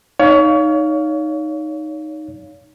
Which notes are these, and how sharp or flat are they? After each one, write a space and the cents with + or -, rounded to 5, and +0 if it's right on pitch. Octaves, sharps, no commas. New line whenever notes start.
D#4 +0 C#5 +30 F5 +0